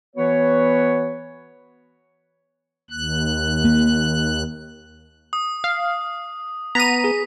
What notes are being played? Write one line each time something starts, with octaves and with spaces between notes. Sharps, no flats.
E3 B3 F#4 B4 C#5
D#2 F#6
A#3
D#6
F5
B3 A#5 B6 D#7
G#4